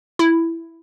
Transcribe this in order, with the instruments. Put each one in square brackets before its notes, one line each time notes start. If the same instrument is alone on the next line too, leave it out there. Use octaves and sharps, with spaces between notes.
[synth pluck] E4